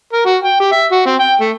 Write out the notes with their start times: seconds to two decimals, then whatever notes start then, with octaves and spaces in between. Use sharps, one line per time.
0.13 A#4
0.25 F#4
0.42 G5
0.60 G4
0.72 E5
0.92 F#4
1.06 C4
1.19 G5
1.41 A3